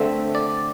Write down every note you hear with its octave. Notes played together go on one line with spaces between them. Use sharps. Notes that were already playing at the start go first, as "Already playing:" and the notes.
Already playing: D3 A3 C4 E5
D5